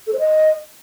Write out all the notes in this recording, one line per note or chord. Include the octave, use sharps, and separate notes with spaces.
A4
C5
D#5